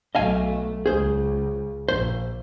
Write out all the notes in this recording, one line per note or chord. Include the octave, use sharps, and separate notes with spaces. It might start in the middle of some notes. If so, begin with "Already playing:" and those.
B1 A3 D#5 F5 G#5
C#2 G#4 C5
A#1 C5